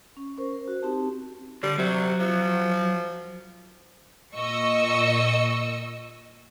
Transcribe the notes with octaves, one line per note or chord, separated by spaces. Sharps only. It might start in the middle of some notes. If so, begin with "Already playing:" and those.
C#4
C#4 A#4 C5
A#4
F#4
C4 D#4 G4 A5
D3 G3
C3 F#3
F3
A#2 D#5 C#6 E6 C#7